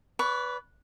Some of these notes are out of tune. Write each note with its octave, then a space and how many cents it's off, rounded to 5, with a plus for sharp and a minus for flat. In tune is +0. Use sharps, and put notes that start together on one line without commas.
B4 +0 D5 -35 C#6 +15